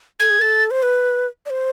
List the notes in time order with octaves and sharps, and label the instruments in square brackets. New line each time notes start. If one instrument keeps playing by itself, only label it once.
[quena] A4 [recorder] G#6
[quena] G#4
[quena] A4 A#4 [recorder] A6
[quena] C5
B4
D5
C5